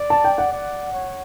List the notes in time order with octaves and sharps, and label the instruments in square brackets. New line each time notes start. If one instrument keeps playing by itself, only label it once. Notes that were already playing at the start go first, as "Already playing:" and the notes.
Already playing: [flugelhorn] D5
[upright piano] A5
G5
F#5
[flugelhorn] D5
C#5